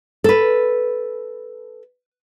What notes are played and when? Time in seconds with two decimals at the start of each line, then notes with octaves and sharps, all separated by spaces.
0.24 A4 B4